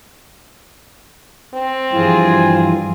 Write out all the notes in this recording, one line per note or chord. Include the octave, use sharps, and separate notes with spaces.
C4
G2 E3 F3 F4 G#4